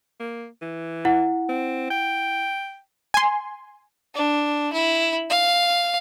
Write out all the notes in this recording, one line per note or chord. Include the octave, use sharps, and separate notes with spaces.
A#3
E3
E4 F#5
C4
G5
G#5 C6
D4
E4
F5